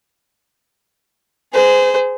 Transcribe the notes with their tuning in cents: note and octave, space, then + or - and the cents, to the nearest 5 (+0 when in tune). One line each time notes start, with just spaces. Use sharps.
G#4 +0 C5 -30